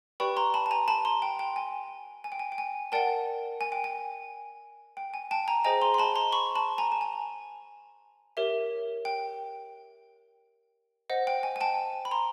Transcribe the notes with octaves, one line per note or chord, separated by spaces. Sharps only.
G4 B4 D5 G5 B5 C#6
A#5 C6
A5 B5
A5
G#5 A#5
A5 B5
A#5 C6
G5
G5
G#5
G#5
G5
G#5
G5
G#5
A#4 D5 F#5 G5 A5
G#5
G5
G#5
G5
G#5
G5 A5
G#5 A#5
G#4 C5 D#5 G5 G#5 A#5
A#5 C6
C6
A5 B5
A#5 C6
B5 C#6
A5 B5
G#5 A#5
A5
G#5
G4 A#4 C#5 E5
G5
C5 D#5 F#5
G5
G#5
G#5
G5 A5
B5
A#5 C6